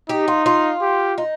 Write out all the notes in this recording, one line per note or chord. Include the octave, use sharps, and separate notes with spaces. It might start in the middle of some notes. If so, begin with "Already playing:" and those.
D#4 G4
F4
F4
G4
D#4